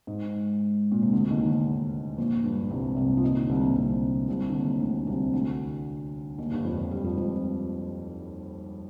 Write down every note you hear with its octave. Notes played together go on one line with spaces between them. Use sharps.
G#2
A#2
C3
D2 D3
D#2 D#3
D2 D3
A#1 A#2
G2
C2 C3
C2 C3
F3
D#2 D#3
D3
C2 C3
A#2
C2 C3
C2 C3
D3
D#2 D#3
D2 D3
C2 C3
D2 D3
D#2 D#3
G2 G3
F2 F3
F2 F3
G2 G3
F2 F3
F2 F3